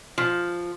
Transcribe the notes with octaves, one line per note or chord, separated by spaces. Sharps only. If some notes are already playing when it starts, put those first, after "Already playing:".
F3